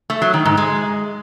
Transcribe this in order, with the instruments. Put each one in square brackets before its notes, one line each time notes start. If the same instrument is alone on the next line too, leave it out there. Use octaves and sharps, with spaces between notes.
[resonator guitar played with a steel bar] A3
F#3
D#3
G#2
G#3